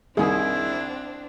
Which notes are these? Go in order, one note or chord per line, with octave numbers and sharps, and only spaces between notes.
C2 D#3 C4 D4 E4 G#4